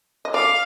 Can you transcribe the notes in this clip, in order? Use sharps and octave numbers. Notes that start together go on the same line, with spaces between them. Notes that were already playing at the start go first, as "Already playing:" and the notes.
D#5
D5 F5